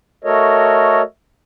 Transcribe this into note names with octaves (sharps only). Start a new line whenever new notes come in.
A3 F#4 A4 A#4 C#5 D#5